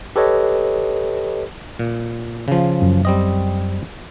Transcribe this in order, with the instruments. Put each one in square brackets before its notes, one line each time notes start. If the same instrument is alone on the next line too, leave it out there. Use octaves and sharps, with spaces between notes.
[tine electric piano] G4 A4 B4 C#5 D#5
[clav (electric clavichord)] A#2
C#3 F3
[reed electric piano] F#2
[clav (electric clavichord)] G3 C4 D#5